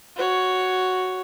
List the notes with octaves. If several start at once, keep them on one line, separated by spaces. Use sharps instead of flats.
F#4 C#5